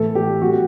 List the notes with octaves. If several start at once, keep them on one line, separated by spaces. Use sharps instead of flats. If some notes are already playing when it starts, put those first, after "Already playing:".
Already playing: A2 E3 A3 A4
G4
A2 G3 F#4